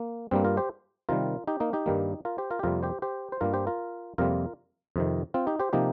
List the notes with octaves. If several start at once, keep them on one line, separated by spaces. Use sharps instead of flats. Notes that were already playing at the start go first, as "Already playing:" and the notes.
Already playing: A#3
G2 G3 A#3 C4
F4 A#4
G4 C5
C3 D#3 G3 F4 A#4
D#4 G4
A#3 D#4
D#4 G4
G2 D#3 G3 A#3
F4 A#4
G4 C5
F4 A#4
G4
F2 C3 G3 A#3 F4 A#4
G4 C5
G4 C5
C5
G2 G3 A#3 F4 A#4
G4 C5
F4 A#4
F2 C3 G3 A#3 F4 A#4
F2 C3 D#3
C4 F4
D#4 G4
G4 C5
C3 F3 A#3 D#4 G4